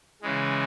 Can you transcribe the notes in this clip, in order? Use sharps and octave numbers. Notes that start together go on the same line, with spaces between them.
C#3 E3 G#3